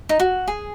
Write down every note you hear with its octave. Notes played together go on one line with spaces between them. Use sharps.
D#4
F#4
G#4